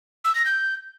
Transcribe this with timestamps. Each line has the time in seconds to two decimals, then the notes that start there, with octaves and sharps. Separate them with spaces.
0.24 E6
0.35 A#6
0.46 G6